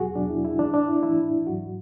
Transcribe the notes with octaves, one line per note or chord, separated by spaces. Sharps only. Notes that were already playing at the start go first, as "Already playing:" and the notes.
Already playing: E2 B2 F#3 F#4 G#4
E2 B2 F#3 D4
E4
E4
A2 E3 D4
D4
E4
A2 E3 E4
G#2 F#3 F#4